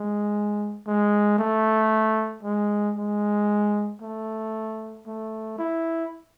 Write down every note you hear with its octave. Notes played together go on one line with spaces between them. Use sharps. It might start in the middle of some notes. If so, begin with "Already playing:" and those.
Already playing: G#3
G#3
A3
G#3
G#3
A3
A3
E4